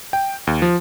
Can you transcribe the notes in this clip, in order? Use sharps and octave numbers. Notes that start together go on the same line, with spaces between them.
G5
D#2
F3